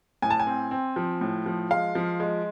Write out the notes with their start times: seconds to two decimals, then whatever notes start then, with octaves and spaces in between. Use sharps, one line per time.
0.22 A2 G#5
0.30 A5
0.40 G#5
0.47 C4
0.71 C4
0.96 F3
1.21 A2
1.46 F3
1.71 G#3 F5
1.95 F3
2.20 G#3